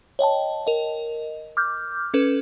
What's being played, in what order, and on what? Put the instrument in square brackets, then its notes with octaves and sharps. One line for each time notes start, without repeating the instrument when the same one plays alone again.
[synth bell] C#5 D#5 G5 A5
A#4 D#5
D6 F6 G6
C#4 A4 B4